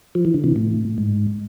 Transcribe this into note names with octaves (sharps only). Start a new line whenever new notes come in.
F3
E3
D3
C3 E3
A2
G#2